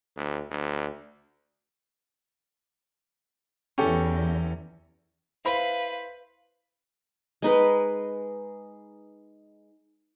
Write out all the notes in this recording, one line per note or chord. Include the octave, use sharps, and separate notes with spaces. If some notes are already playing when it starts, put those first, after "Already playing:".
D2
D2
E2 C#4 G4 A4
E4 B4 C5 F5 B5
G#3 D#4 B4